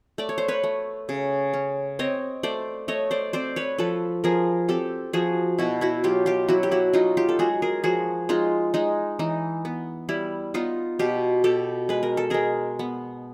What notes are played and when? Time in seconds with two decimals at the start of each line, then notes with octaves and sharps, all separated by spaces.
0.18 A3 D5
0.29 C#5
0.38 C5
0.48 B4 C#5
0.63 A3
1.09 C#3
1.53 C#4
1.99 C4 C#5 D#5
2.43 A3 C5 D5
2.88 A3 C#5 D#5
3.11 C5 D5
3.33 C4 C5 D5
3.56 B4 C#5
3.78 F3 A4 B4
4.24 F3 G#4 A#4
4.68 C4 G4 A4
5.13 F3 F#4 G#4
5.58 B2 E4 F#4
5.81 E4 F#4
6.04 F#3 F4 G4
6.26 F4 G4
6.48 F#3 E4 F#4
6.63 G4
6.71 E4 F#4
6.93 F#3 D#4 F4
7.17 F4 G4
7.29 A4
7.39 G#3 F#4 G#4
7.62 G#4 A#4
7.84 F3 F#4 G#4
8.29 G#3 D#4 F4
8.74 G#3 D#4
9.19 E3 D#4
9.65 B3
10.09 G3 E4
10.54 B3 D#4 F4
10.99 B2 F4 G4
11.44 B2 G4 A4
11.89 G#3 B4
12.03 A#4
12.17 A4
12.30 G#3 G#4 A#4
12.79 B3